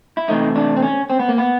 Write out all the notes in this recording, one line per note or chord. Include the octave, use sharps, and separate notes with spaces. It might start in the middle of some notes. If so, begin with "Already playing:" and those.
E4
C3 E3 A3 D#4
D4
C4
C#4
C4
B3
A#3
B3